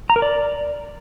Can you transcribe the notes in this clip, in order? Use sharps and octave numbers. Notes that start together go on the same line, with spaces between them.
A#5
A#4
D5